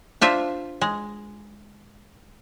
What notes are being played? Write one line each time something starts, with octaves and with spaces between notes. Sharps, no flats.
D4 F4 C5 E5
G#3